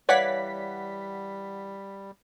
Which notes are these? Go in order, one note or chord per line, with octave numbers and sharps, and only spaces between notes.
E3 G3 C#5 D5 F5 F#5 G#5 B6